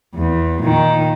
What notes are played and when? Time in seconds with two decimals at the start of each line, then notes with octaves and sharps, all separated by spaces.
0.15 E2
0.63 A#2 D#3